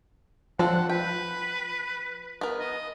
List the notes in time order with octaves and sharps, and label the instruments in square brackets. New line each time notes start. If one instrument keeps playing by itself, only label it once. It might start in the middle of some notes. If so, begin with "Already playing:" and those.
[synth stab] F3 [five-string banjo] C4 D4 A4 [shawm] F#5
[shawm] B4 [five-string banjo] G5
[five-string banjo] B3 A#4
[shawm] D#5